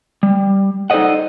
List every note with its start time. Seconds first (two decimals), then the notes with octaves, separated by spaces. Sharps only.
0.23 G3
0.90 D#4 A4 C5 D5 D#5 F#5